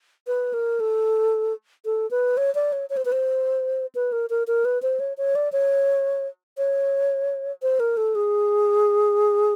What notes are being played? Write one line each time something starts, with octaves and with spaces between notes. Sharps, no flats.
B4
A#4
A4
A4
B4
C#5
D5
C#5
C#5
C5
B4
C5
B4
A#4
A#4
A#4
B4
C5
C#5
C#5
D5
C#5
C#5
C5
A#4
A4
G#4